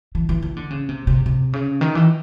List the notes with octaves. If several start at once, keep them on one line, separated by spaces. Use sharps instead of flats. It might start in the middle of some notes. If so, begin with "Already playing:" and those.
E3
E3
E3
D3
C#3
C3
C3
C3
C#3
D#3
E3